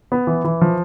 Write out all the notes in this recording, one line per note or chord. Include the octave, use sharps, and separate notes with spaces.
B3
E3
E3
F3